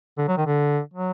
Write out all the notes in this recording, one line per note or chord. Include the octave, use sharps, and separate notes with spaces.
D3
F#3
D#3
D3
F#3